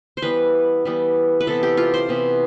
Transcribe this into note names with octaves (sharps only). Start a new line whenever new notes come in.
C5
E3 G3 B3 B4
E3 G3 B3
B4
C3 E3 B3 A4
G4
F4
C5
C3 E3 B3